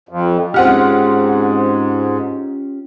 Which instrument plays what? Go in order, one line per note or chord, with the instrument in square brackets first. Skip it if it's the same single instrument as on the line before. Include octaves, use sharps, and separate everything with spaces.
[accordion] F2
[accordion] G#2 [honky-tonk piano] C4 F#5 F6 [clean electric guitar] C#4 F4 G4